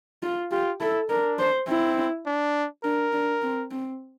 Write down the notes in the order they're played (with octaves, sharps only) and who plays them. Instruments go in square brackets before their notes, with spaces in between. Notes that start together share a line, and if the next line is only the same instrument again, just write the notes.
[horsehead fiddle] F4
[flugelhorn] F4 [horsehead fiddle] G4
[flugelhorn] E4 [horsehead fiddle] A4
[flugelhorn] D4 [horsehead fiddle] A#4
[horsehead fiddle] C5
[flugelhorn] C4 [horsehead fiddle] E4
[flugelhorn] D4
[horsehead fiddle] D4 [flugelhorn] A#4
[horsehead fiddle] D4
C4
C4